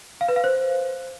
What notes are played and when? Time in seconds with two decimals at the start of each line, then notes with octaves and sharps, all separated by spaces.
0.21 F5
0.28 B4
0.36 F5
0.44 C5